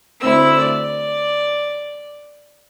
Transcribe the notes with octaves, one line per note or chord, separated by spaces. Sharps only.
D2 C4 E4 E6
D5